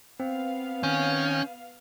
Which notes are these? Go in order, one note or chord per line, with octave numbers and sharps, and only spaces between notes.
B3 C4 F5
D#3 C#4 G5 F6